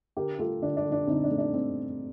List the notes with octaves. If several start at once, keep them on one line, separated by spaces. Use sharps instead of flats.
D3 G4 A#4
A3 F4 A4
D3 D4
D4
D3
D4
D3 C4 D#4
D4
A3
D4
A3 C4